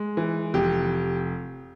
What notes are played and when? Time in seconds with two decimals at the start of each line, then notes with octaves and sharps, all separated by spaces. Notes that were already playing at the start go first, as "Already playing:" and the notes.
Already playing: G#3
0.17 E3
0.54 F1 G4